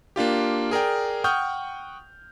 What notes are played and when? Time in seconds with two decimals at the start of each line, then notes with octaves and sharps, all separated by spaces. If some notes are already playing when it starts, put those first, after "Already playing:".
0.16 A#3 D4 F4 G4
0.71 G#4 A#4 D5 G5
1.24 F#5 G5 C#6 D#6 F6 G6